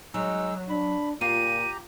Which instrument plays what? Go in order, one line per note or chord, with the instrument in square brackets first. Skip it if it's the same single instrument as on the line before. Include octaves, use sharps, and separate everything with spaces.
[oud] F#3 [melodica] G#3 D#4 E6
[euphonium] D4 [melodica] B5
[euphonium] A#2 [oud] F4 [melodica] G4 A#5 [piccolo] D#7